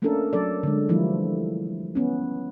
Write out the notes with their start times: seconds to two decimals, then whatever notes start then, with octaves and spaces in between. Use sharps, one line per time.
0.02 A3 A#3 C#4 D4 A4 A#4
0.33 F#3 A4 D5
0.63 D3 G#3
0.89 E3 F3 G3 A3 A#3 E4
1.95 B3 C#4